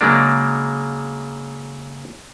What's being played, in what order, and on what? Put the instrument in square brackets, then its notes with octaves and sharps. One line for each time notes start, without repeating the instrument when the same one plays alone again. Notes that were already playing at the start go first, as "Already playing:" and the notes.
[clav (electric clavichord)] C#3 F#3 G#3 A#3 D4